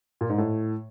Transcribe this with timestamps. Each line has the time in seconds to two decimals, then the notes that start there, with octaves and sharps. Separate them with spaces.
0.21 A#2
0.29 G#2
0.38 A2